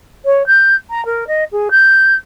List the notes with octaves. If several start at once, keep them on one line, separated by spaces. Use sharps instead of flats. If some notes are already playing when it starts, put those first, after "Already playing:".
C#5
G6
A#5
A#4
D#5
G#4
G6